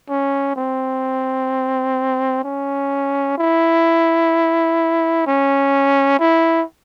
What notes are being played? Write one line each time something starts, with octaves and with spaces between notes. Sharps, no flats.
C#4
C4
C#4
E4
C#4
E4